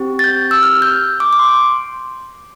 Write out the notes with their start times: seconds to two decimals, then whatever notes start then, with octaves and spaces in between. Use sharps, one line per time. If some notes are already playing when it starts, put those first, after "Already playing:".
Already playing: C4 G4
0.19 A6
0.24 G6
0.51 E6
0.63 F6
0.82 G6
1.20 D6
1.33 D6
1.39 C6